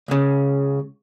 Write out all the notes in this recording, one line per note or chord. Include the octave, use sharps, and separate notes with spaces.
C#2 C#3